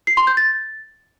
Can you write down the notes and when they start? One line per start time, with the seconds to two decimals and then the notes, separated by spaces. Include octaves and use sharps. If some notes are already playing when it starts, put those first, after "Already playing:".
0.07 C7
0.17 C6
0.27 G6
0.37 A6